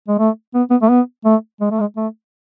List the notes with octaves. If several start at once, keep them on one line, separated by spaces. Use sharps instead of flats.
G#3
A3
B3
B3
A3
B3
A3
G#3
A3
G#3
A3